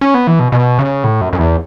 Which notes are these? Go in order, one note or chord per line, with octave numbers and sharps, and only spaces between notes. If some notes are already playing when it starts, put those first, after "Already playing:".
C#4
B3
E3
B2
B2
C#3
A2
F#2
F#2
E2